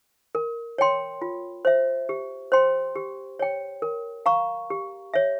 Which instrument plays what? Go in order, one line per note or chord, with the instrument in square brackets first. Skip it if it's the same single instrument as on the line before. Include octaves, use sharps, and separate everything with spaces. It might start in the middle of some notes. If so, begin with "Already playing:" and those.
[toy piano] A#4
C#5 G5 C6
F4
C5 E5
G4
C5 G5 C6
G4
C#5 G5
A#4
F5 A#5 C#6
G4
C#5 E5